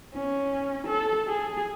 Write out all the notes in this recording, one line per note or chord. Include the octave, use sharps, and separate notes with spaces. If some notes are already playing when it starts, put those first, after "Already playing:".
C#4
A4
G#4